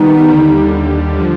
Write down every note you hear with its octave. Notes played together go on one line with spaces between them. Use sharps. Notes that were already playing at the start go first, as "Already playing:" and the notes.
Already playing: D#3 G3 B3 D#4
D#2 D3 G3
D3 F3